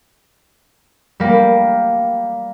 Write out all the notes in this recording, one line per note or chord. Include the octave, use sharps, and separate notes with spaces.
G3 A#3